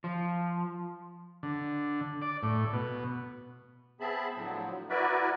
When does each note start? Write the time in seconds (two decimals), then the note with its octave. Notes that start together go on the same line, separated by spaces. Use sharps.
0.04 F3
1.43 D3
2.22 D5
2.43 A2
2.73 B2
4.00 B3 C4 G#4 E5 A5 B5
4.36 A2 D3 F3 F#3
4.89 E4 F#4 A#4 B4 D5 E5